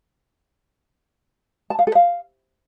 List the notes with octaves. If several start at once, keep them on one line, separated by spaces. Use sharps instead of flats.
A5
F5
A4
F5